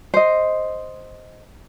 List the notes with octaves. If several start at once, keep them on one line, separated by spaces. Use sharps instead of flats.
C5 D#5